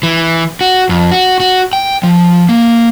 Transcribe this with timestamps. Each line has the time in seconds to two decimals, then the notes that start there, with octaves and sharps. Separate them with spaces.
0.03 E3
0.61 F#4
0.89 F2
1.11 F#4
1.40 F#4
1.73 G5
2.03 F3
2.49 A#3